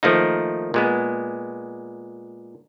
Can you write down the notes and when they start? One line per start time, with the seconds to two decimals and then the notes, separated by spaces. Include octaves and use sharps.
0.03 D#3 F3 A3 A#3 D#4
0.74 A#2 G#3 B3